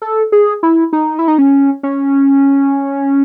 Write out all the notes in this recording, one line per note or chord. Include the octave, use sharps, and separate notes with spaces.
A4
G#4
E4
D#4
E4
D#4
C#4
C#4